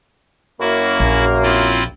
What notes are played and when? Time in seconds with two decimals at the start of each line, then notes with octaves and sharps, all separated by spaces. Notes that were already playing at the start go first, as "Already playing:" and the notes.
0.60 F#2 A#3 E4 F#4
1.00 A#1
1.43 C4 E4 F4